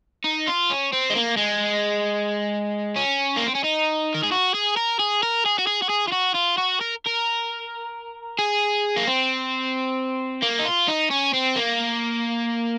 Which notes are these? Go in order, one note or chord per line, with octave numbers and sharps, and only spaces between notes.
D#4
F4
C#4
C4
G#3
A#3
G#3
C#4
A#3
C4
C#4
D#4
A#4
G#4
F#4
G#4
A#4
G#4
A#4
G#4
F#4
G#4
F#4
G#4
F4
F#4
F4
F#4
A#4
A#4
G#4
A#3
C4
A#3
D#4
F4
D#4
C#4
C4
A#3